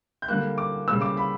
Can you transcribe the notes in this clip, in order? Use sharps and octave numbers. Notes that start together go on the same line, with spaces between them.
G6
D3 G3 A#3 F#6
D6
C#3 G3 A#3 E6
D6
B5